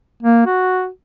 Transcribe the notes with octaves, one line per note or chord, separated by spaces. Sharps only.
A#3
F#4